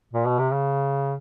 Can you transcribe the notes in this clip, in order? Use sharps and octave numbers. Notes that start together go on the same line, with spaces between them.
A#2
B2
C3
C#3